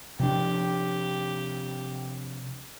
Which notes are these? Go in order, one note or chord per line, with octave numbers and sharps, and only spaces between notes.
C3 F3 D4 G4